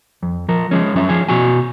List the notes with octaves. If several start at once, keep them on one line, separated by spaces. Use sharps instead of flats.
F2
F3 A#4
F3 G#3 C#4
F#2 C#4 E5
F3 C#4 G#4
B2 F#4 G#5